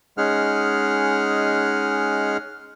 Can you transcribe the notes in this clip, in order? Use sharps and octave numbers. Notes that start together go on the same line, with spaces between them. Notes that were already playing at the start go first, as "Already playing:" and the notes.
G#3 C#4 D#4 G#4 F#5 F6